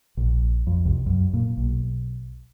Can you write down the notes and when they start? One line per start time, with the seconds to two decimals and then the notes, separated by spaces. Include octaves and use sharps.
0.17 A#1
0.67 F2
0.85 C2
1.06 F#2
1.34 A#2
1.57 B1